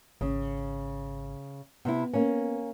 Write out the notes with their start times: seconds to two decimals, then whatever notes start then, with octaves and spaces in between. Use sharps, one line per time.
0.21 G#1 C#3
1.85 C3 B3 E4
2.13 A#3 C#4